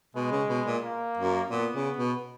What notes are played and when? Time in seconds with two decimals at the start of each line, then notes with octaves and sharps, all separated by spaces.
0.15 B2 G#3
0.31 C#3
0.49 B2
0.66 A#2
0.83 A#3
1.17 F#2
1.51 A#2 B3
1.74 C#3
1.97 B2